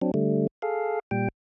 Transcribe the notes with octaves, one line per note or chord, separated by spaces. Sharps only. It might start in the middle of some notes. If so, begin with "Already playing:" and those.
F#3 C4 D4
D3 G3 A3
G#4 A4 F5
A#2 G3 G5